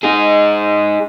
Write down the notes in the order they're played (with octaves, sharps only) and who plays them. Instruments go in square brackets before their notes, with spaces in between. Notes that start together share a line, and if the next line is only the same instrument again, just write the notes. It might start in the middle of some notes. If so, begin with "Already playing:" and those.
[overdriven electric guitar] D#4 G#4